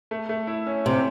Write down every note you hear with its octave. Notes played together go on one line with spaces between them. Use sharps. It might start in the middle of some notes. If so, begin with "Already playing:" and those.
A3
A3
E4
C#4
C3 C#4